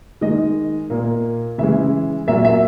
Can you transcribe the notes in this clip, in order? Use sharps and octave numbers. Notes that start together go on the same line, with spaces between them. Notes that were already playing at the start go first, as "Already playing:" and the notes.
D#3 G#3 D#5
A#2 A#3
C#3 E3 G#3 E5
A#2 F#3 A#3 E5
E5